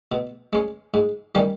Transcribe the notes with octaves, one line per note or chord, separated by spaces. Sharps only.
B2
G#3 C#4
G#2
D#3 G3 C#4